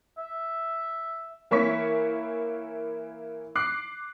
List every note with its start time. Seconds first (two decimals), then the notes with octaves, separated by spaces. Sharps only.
0.18 E5
1.51 E3 A#3 E4 C#5 C#6 B6
3.55 D6 F#6 C7